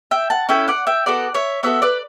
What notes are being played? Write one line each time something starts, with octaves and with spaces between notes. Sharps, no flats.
E5 G5
F#5 A5
C#4 E4 A4 E5 G5
D5 F#5
E5 G5
B3 F#4 A4 D5 F#5
C#5 E5
B3 F#4 A4 C#5 E5
B4 D5